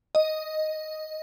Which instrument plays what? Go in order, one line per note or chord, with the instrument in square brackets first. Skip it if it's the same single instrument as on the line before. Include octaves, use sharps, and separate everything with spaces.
[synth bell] D#5